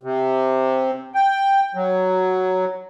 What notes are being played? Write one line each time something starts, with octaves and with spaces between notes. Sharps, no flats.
C3
G5
F#3